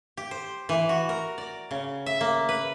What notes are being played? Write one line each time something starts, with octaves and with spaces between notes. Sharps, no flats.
G4
C5
E3
F#4
A#4
D5
C#3
E5
A#3
B4